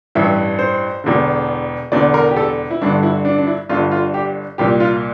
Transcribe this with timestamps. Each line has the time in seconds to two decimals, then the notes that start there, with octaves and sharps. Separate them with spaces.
0.15 A1 G2 E3 E5
0.59 C5
1.04 E1 E2 D3
1.92 E1 E2 D3 D5
2.14 A#4
2.31 G4
2.37 A4
2.71 E4
2.81 G1 G2 D3 D4
3.03 E4
3.25 D4
3.38 D4
3.47 E4
3.69 G1 G2 D3 F4
3.91 F4
4.14 G4
4.58 C2 A#2 G4
4.80 F4